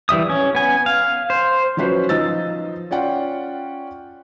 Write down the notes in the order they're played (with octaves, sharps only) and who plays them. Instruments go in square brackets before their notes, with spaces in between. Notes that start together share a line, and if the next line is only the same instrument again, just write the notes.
[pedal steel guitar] E3 G3 E5 D#6
C#4
B3 G#5
F5
C5
[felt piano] F3 F#3 C#4 B4 C5
F3 D#4 D#5 E6 A6
C#4 F4 D5 F#5 G5